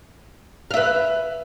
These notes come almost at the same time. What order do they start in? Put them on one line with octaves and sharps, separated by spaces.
F5 E5 B4